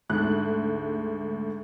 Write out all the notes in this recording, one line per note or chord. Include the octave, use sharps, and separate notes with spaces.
D2 G#2 F#6